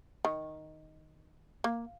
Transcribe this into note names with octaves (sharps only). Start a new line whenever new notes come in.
D#3
A#3